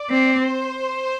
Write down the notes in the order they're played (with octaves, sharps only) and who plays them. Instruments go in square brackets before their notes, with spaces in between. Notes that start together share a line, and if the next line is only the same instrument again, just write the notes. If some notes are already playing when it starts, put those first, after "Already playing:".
Already playing: [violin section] D5
[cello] C4
[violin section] C5